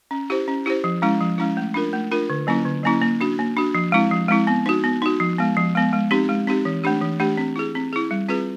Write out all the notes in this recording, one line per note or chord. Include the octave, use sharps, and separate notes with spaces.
C#4
E4 G4 C5
C#4
E4 G4 C5
F3
G#3 C#4 E4
F3
G#3 C#4 E4
A3
D4 F4 A#4
A3
D4 F4 A#4
D3
F#3 A#3 C#4 E4
D3
F#3 A#3 C#4 E4
A#3
D4 F#4
A#3
D4 F#4
F3
G#3 C4 E4
F3
G#3 C4 E4
B3
D#4 F#4
B3
D#4 F#4
F3
G#3 B3
F3
G#3 B3
G#3
C4 D#4 G4
G#3
C4 D#4 G4
E3
A3 D4 G4
E3
A3 D4 G4
C4
E4 G#4
C4
E4 G#4
G3
C4 F4 G#4 B4